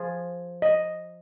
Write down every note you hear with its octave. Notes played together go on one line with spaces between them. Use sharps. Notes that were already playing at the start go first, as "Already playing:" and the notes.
Already playing: F3 G#4
D#5